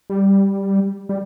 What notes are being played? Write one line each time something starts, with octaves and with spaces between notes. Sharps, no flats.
G3
G3